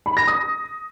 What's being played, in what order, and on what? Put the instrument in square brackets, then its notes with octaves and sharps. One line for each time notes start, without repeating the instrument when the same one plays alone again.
[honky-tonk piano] B5
A#6
D#6